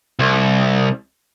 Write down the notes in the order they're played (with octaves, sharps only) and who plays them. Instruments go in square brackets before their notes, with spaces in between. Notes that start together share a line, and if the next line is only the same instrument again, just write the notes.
[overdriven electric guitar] C2